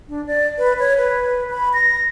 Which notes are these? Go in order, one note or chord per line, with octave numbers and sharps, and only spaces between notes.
D4
D5
B4
C#5
B4
B5
A#6